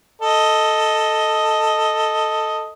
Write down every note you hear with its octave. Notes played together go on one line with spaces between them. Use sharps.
A4 D#5